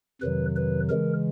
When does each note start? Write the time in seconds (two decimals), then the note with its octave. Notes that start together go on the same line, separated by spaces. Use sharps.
0.21 F2 C3 D#3 F#3 B4
0.56 B4
0.89 C#3 E3 G#3 A#4